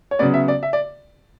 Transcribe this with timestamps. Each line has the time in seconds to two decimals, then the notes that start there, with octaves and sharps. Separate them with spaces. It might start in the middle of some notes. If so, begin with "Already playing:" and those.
0.11 C#5
0.19 C#3 F#3 B3 D5
0.34 E5
0.48 D5
0.63 E5
0.73 D5